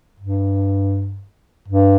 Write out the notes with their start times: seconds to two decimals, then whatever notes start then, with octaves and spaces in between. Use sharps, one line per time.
0.20 G2
1.68 G2